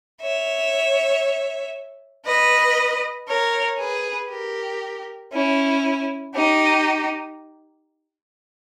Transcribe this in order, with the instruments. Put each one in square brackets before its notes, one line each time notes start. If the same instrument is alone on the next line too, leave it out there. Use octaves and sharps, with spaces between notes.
[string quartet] C#5 E5
B4 D#5
A#4 C#5
G#4 B4
G4 A#4
C#4 E4
D#4 G4